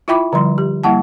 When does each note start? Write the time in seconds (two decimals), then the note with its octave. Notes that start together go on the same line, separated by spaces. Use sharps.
0.08 E4 F4 E5 G5 B5 D6
0.33 D3 F3 G3 C6
0.58 G4
0.84 G3 A#3 E4 F#5 A5